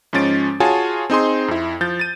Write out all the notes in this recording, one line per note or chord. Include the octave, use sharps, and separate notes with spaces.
G#2 F3 C#4 A6 D7
F4 F#4 G#4 C#5 G#5 A5
C4 D#4 G#4 C6
F2 E4
F3 G6 A6
A6 D#7